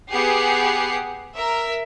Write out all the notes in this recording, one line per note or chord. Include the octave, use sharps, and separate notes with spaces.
B3 G4 G#4 F#5 C7
A#4 E5